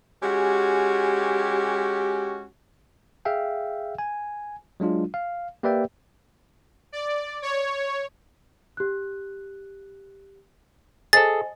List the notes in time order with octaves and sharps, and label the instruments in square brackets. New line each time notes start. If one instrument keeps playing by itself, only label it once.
[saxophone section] G#3 C#4 F#4 G4
[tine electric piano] G#4 E5 F5 G5
G#5
F#3 G#3 D4 F4
F5
A#3 G4 B4 D5 E5 G5
[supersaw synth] D5
C#5
[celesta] G4 F#6
[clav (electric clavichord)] G#4 A4 [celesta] C5 D#5 G#5 [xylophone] A6